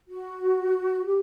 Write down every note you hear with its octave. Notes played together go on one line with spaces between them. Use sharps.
F#4
G4